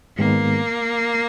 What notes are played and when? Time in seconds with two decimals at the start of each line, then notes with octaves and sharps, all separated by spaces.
0.18 G#2 D#3 G#3 A#3 B3